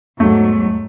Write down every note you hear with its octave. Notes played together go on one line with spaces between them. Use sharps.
E2 G#2 F#3 A3